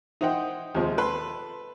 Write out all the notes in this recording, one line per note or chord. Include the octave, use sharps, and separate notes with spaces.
D#4 E4 C5 D#5 F#5 G5
D#2 C3 F3 G#3
A4 B4 C6